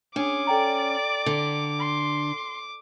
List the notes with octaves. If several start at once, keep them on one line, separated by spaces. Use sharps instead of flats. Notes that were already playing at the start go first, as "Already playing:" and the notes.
C#4 D4 G#4 D6
A4 D5 G5 A#5
D3
C6